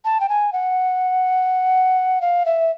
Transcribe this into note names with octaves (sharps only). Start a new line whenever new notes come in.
A5
G5
G#5
F#5
F5
E5